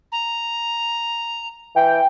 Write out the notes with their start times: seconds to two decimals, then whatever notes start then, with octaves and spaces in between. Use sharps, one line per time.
0.12 A#5
1.76 E3 G5